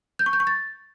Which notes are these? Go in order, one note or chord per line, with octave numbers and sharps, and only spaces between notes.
G6
C#6
G6
C#6
A6